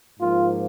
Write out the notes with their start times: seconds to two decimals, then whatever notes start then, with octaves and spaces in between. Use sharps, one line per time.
0.19 G#2 F3 A#3 F4